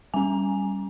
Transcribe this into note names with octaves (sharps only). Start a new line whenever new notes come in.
G3 C#4 G#5